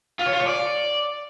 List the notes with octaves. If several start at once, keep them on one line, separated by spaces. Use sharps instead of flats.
F4
C#5
F4
C#5
D5